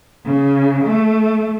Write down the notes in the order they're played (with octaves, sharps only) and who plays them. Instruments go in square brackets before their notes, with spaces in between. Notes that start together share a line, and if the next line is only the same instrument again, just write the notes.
[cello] C#3
A3